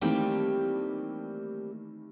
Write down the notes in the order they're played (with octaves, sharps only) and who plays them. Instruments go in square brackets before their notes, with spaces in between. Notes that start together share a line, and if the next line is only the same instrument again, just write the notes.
[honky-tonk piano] D#3 E3 A3 [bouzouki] G3 G4 [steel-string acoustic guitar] A#3 C4